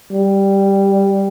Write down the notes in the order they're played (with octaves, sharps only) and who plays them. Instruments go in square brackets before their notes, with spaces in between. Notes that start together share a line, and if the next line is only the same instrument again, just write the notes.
[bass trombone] G3